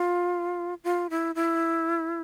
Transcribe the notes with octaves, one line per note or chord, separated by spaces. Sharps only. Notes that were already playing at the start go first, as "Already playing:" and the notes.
Already playing: F4
F4
E4
E4